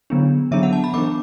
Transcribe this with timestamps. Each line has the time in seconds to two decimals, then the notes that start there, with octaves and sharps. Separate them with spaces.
0.10 D3 F#3 B3 D4
0.51 D3 F#3 B3 D4 E5
0.63 F#5
0.73 A5
0.84 B5
0.94 E3 B3 D4 D6